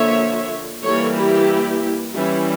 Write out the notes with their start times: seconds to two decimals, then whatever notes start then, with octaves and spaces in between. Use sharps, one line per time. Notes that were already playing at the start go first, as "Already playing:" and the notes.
Already playing: D3 F3 A#3 C#5 E5
0.83 E3 G3 A#3 A4 C#5
1.16 E4 G4
2.15 E3 G3 C#4 E4